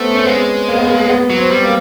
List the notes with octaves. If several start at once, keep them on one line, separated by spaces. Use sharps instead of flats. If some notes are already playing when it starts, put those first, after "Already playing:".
Already playing: A3 B3 C4
C#4
C4
G#3 B3
A#3
B3
A#3
B3
F#3
C4
G3
A#3